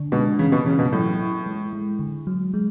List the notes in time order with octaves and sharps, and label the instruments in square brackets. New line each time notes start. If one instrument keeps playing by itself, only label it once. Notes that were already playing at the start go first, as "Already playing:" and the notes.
Already playing: [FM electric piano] D3 D4
[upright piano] B2 [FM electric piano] G#3
[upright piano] C#3 [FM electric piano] E3
[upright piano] B2
[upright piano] C#3 [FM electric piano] E3
[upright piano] B2
[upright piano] A2 [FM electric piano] F#3
[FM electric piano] E4
G#3
G#3
D3
F#3
G#3